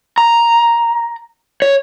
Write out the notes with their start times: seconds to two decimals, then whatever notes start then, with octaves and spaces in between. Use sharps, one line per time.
0.18 A#5
1.62 C#5